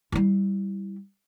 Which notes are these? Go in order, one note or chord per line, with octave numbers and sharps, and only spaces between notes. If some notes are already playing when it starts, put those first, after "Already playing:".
G3 E4